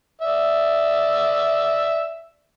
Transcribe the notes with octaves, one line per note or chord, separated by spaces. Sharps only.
D5 E5